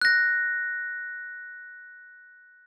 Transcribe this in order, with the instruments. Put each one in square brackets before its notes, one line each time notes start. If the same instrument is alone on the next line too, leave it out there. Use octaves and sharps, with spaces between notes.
[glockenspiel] F#6 A#6